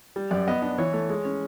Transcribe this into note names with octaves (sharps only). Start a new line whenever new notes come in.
G3
F#2 D5
B3 D#5
D4 D#5
E3 C#5
A3
G#3
C#4